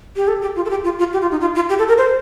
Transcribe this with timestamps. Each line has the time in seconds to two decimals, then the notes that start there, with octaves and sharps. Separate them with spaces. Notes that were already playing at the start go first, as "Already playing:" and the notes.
0.16 G4
0.28 A4
0.42 G4
0.56 F4
0.65 A4
0.70 G4
0.84 F4
0.99 F4
1.13 G4
1.22 F4
1.31 D#4
1.41 F4
1.55 F4
1.69 G4
1.79 A4
1.88 A#4
1.98 C5